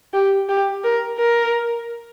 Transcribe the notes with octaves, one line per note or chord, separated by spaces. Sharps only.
G4
G4
A#4
A#4